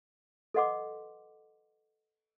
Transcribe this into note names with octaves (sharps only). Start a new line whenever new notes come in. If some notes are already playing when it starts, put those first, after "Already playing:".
A4 B4 D#5 F#5 C6 D6